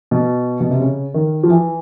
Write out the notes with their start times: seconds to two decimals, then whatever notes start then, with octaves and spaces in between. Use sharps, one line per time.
0.11 B2
0.60 B2
0.70 C3
0.80 C#3
1.14 D#3
1.43 F3
1.49 E3